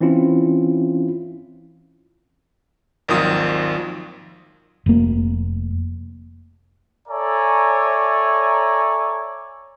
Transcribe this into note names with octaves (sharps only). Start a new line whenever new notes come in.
E3 C4 C#4 E4 F4
G#1 D#2 D#3 F3 F#3 D#6
F1 A#3
A4 C#5 D5 E5 G#5 A#5